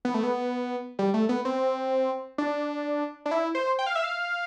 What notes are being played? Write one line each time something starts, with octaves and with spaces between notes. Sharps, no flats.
B3
A3
B3
G3
A3
B3
C4
D4
D4
E4
C5
G5
F5
E5
F5